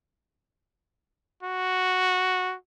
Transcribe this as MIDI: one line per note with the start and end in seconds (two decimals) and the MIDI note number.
1.43 2.55 66